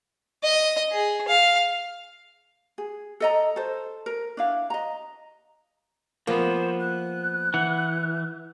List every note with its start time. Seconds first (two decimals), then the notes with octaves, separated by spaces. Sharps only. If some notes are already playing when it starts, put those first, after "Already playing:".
0.43 D#5
0.91 G#4
1.28 F5
2.78 G#4
3.20 A4 D#5 A#5
3.56 A4 C5
4.06 A#4
4.37 D4 E4 F5
4.70 D#5 A#5
6.27 F3 A#3 B3 C5
6.80 F#6
7.54 E3 F#5